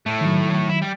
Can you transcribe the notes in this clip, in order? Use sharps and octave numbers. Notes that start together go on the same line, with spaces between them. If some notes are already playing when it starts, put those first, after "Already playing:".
A2 A3
D#3 F#3
E4
G3